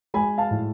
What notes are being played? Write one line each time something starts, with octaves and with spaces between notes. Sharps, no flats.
G#3 G#5 B5
F5 A5
A2